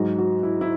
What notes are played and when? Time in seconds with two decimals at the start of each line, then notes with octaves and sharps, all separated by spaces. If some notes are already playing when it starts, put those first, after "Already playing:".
Already playing: G#2 F#3 F#4
0.18 F#4
0.43 E4
0.61 E4